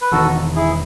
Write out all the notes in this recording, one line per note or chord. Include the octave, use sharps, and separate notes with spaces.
B4
E1 E2 D#3 F#4 A4
E4 G#4